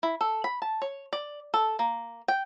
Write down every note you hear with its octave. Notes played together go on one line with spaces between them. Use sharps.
E4
A4
B5
A5
C#5
D5
A4
A#3
G5